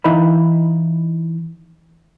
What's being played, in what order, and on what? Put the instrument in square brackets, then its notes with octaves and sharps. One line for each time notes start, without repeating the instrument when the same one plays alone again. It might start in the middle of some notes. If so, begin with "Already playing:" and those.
[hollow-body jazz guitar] E3 D#4 E4 D#5 F5 B5